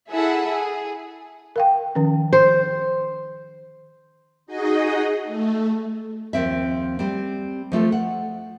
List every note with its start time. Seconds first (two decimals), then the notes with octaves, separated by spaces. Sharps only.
0.11 E4 G#4 A4 E5 F#5
0.53 G#4
1.56 A#4 F5 G5
1.95 D#3 F3 C#4
2.33 C5
4.47 D#4 F#4 G#4 D#5
5.25 A3
6.33 D#2 F3 C4 E5
6.99 G3 C4
7.72 F3 A3 F4 A4
7.92 F#5